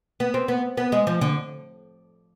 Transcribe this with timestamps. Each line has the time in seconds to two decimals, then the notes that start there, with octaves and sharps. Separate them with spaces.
0.20 B3
0.34 C4
0.48 B3
0.77 B3
0.92 G#3
1.07 F3
1.21 D3